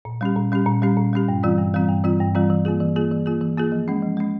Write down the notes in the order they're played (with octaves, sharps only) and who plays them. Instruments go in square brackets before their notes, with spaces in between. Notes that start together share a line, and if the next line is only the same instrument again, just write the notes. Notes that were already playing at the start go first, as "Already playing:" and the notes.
[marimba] A#2
G3 C#4 G4
A#2
G3 C#4 G4
A#2
G3 C#4 G4
A#2
G3 C#4 G4
G2
E3 G3 C4 F4
G2
E3 G3 C4 F4
G2
E3 G3 C4 F4
G2
E3 G3 C4 F4
E3
A#3 F4 G#4
E3
A#3 F4 G#4
E3
A#3 F4 G#4
E3
A#3 F4 G#4
F3
G#3 C#4
F3
G#3 C#4